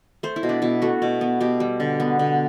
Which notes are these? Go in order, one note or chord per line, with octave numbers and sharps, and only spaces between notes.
A3 C5
E4
B2
D4
B2 E4
A3 F#4
B2
B3
B2 G4
G3
D3
B3
D3